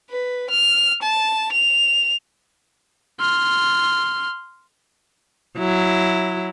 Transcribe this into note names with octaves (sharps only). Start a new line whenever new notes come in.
B4
F6
A5
F7
C6 F6
F#3 E4